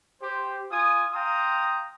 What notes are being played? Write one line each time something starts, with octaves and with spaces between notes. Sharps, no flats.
G4 C5
F4 G#5 D#6
F5 G5 A#5 C6 D#6